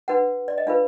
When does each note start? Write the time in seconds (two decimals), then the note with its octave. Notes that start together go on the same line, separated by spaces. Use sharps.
0.08 D4 F#4 B4 F#5
0.48 D5
0.58 D#5
0.67 D4 F4 B4 F5